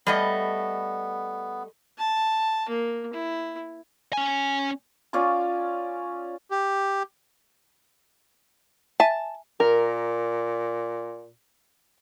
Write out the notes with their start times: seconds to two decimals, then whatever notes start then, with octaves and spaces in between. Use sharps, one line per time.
0.07 G3 A3 B3 D#5
1.98 A5
2.69 A#3
3.14 E4
4.13 C#4 G#5
5.13 C#4 F4 D5 C6
6.50 G4
9.00 E5 G#5 A5
9.60 A#2 A#4